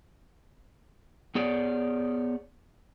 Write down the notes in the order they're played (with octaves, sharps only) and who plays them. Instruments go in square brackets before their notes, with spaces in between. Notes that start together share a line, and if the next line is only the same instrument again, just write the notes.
[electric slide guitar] B3 G#4 C#5 D5